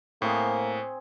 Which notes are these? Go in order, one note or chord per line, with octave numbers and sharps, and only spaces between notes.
A2 A#3 C4 G#4